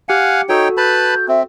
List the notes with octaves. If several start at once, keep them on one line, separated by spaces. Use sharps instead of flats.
G4 F5 F#5 G#5 C#7
D#4 F#4 A4 C#5 G5
B4 A5 B5 G6
C4 E5